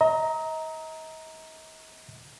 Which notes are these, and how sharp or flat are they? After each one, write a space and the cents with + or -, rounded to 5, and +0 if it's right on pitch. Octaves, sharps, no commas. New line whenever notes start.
D#5 +40 A#5 +0